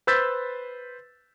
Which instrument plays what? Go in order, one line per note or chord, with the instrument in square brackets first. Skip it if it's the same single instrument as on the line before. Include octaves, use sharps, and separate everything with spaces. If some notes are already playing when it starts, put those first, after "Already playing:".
[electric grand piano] B4 C5 E6 G6 A6 B6